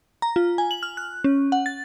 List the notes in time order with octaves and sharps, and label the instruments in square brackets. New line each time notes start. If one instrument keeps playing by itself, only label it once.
[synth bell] A#5
F4
G#5
F#7
F6
F#6
C#4
F#5
A6